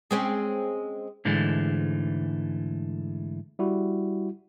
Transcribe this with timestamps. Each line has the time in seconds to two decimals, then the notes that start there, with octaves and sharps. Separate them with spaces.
0.11 G#3 C4 C#4
1.25 G#2 D3 E3 G#3 A3
3.59 G3 E4 F#4